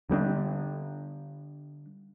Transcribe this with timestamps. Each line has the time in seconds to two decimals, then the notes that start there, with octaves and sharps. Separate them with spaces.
0.10 D3 G3 B3 D4